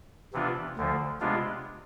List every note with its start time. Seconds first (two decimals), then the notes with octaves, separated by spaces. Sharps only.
0.33 C3 E3 B3 D4 F4
0.77 D2 D3 F3
1.20 C3 G#3 B3 D4 F4